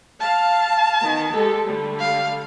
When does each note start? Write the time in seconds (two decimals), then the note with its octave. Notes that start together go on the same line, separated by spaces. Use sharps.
0.21 F5 A5
1.02 D#3 B3
1.33 G#3 G4 A4
1.67 D3 G3 A3
2.00 F5